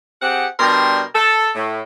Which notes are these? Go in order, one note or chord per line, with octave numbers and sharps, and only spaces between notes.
C4 G4 G#4 F#5
B2 G3 D4 G4 A#4 C6
A4
A2